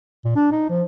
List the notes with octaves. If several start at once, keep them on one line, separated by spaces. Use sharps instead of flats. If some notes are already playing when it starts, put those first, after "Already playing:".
A#2
D4
D#4
F3